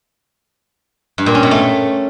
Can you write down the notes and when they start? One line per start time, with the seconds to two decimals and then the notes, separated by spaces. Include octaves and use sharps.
1.18 G2
1.26 A#2
1.35 C#4
1.43 B2
1.51 A3